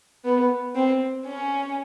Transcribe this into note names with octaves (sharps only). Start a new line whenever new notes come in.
B3
C4
C#4